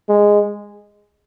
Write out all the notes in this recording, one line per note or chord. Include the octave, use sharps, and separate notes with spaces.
G#3